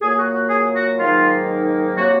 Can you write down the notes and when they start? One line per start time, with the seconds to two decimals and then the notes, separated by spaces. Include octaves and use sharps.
0.01 A#2 F#3 A#3 G#4
0.17 F#4
0.33 F#4
0.50 G#4
0.75 F#4
0.98 G#2 D#3 F#3 A#3 F4
1.97 C3 F#3 A#3 F#4